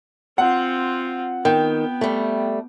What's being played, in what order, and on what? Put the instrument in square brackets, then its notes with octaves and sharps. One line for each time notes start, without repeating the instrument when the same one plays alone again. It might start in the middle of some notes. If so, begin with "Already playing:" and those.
[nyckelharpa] C4 F4 [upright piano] F#5
[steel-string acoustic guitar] D#3 [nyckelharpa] B3 [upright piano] G5
[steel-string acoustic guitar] G3 A3